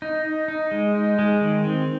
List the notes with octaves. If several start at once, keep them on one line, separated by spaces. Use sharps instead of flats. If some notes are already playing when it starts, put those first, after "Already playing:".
D#4
D#4
D#4
G#3
D#4
G#3
D#3
C4